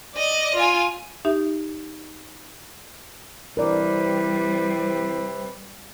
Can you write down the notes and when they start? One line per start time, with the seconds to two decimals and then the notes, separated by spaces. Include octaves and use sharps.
0.14 D5 D#5
0.55 F4 G#5
1.25 D#4 G4 E5
3.57 C3 E3 G3 C4 A#4 B4 D5